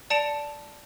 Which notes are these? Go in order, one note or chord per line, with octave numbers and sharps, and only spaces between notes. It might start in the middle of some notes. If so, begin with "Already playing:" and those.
D5 A5 C#7 D7 F7